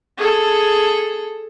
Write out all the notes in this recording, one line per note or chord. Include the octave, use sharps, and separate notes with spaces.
G#4 A4